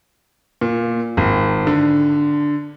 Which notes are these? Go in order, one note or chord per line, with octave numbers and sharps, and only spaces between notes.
A#2
G#1
D3